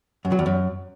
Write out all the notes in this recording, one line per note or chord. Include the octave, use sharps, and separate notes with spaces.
F#2
F#3
E2
F#2